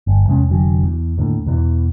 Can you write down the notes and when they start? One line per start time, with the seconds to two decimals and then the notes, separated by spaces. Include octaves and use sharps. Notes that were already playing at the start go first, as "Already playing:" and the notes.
0.07 G1
0.27 E2 C3 G#3 C#4
0.49 F1 D3 F#3
0.83 E2
1.18 D#2 A2 D3
1.46 E2 B2 D#3 E3